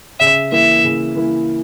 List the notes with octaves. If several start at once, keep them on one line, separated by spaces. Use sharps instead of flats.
C#3 E5
E3 A#3 E4 E5
C#3
E3 A#3 E4